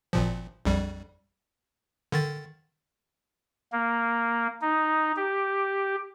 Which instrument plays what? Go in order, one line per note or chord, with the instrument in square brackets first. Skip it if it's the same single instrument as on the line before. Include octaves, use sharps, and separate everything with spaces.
[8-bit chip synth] G#1 A#2 F3
A#1 F2 G3
D3 D#3 A6
[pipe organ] A#3
D#4
G4